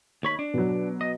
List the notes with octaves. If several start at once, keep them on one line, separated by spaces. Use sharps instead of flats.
D#2 C#5 B5
D4
B2 F#3
D#5